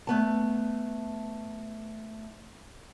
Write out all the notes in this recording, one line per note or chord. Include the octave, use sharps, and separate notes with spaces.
A3 B3 A5